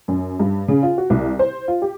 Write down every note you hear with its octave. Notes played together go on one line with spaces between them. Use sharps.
F#2
G2
C#3
F4
F#4
C2
C5
F4
G4